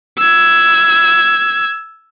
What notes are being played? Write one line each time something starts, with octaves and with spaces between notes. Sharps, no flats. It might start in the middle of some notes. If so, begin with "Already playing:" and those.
E6 G#6